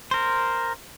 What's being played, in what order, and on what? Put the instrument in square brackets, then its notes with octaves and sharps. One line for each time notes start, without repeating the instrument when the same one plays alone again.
[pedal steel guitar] A#4 C5